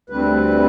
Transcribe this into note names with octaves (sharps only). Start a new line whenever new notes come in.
D2 D3 G3 C4 B4